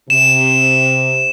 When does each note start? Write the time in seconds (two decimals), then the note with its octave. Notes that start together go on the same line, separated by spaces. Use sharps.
0.10 C3 E7